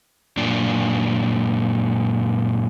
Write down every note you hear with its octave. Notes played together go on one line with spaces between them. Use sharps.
F#2 A#2 D4